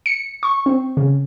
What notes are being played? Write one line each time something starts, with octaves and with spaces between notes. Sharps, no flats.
C#7
C#6
C4
C#3